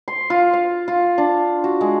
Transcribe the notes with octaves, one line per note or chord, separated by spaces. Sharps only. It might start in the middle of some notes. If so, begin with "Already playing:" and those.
C6
F4
F5
F4
D4
F#4
G#3